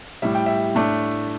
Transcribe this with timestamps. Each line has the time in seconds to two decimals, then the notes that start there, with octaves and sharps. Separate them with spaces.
0.22 A2 G3 E4 E5
0.35 G5
0.46 E5
0.75 A2 A3 D4